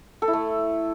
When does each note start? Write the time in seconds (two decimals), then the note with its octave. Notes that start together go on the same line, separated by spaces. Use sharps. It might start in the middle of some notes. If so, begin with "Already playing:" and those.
0.22 A4
0.28 E4
0.33 A3